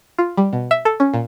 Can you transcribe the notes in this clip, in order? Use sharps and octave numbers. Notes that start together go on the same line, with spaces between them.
F4
G3
B2
E5
A4
C#4
A#2